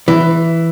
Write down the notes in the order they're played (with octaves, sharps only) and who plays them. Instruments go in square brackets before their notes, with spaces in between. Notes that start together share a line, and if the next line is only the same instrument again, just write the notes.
[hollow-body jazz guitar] E3